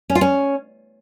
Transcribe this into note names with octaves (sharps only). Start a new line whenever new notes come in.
C#4
F4
C#4